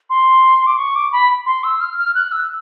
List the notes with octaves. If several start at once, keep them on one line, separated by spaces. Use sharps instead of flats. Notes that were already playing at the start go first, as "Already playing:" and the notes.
C6
D6
C#6
D6
B5
C6
E6
F6
F6
F#6
E6